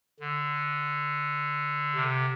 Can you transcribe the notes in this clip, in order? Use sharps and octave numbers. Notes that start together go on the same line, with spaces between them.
D3
C3